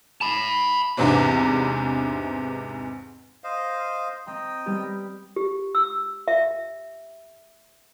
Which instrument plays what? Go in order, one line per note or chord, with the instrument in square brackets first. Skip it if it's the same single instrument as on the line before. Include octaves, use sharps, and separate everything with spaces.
[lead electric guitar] A5 B5
[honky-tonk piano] E2 G#2 C3 E3 C4 D4
[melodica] C5 D#5 F5
[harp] C4 A#5 [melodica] D#5 G5
[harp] G3 B3 G4
[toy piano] G4
E6
E5